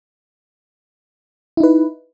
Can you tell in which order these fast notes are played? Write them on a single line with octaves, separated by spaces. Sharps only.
E4 D#4 B4